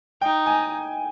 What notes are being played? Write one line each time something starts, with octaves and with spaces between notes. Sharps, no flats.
D#4 G5
G#5